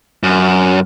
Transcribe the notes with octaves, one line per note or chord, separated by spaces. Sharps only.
F#2